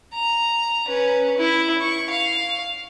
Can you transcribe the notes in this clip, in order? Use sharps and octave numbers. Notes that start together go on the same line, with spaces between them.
A#5
C#4 B4
E4
C#6
F5